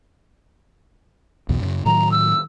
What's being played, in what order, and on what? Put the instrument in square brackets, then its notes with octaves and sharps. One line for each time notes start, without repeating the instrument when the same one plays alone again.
[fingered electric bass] B1 E2 B2
F#2 C#3
[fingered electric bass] A2 D#3 F#3 [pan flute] A#5
[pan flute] E6